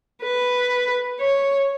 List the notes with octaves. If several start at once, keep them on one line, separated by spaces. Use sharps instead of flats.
B4
C#5